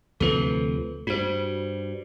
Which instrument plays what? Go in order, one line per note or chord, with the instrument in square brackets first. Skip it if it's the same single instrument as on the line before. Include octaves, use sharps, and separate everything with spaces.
[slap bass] D2 C3 F3 [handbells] A4 B4
[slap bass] G2 [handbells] F#4 C5